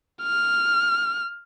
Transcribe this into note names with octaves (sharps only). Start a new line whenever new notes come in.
F6